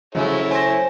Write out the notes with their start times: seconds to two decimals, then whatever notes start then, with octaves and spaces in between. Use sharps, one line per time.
0.15 C#3 F3 F#3 G#3 E4 A4 C#5
0.51 C5 G#5 A#6